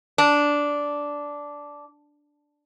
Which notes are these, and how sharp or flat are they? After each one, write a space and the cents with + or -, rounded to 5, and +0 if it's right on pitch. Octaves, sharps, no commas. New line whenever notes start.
D4 -10